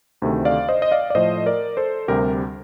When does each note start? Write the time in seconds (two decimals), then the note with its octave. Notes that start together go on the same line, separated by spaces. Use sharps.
0.22 D2 C3 D#3 A3
0.45 D5 F5
0.69 C5 D#5
0.82 D#5
0.91 D5 F5
1.10 D5
1.15 A2 F3 A3 C5 D#5
1.46 A#4 D5
1.77 A4 C5
2.08 D2 C3 G3 G4 A#4